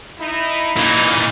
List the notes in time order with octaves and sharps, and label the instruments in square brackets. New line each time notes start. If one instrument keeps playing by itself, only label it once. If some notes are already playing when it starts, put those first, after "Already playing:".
[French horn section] D#4 E4
[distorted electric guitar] A#2 E3 [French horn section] A#3 D#4